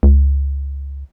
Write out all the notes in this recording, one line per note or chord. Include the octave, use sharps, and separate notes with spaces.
C#2